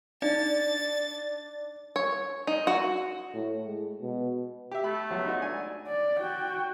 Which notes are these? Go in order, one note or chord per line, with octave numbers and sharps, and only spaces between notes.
D4 D#4 A6
C#5
D#4
F#4
A2
G#3
B2
G4 E5
A3 B5
C#2 F#3 B3
D#4 F#4 C#5
D4 G#5
D5
F#4 G5